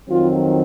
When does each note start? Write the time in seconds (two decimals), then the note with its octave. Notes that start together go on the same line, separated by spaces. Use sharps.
0.09 F2 D#3 F#3 C4 F4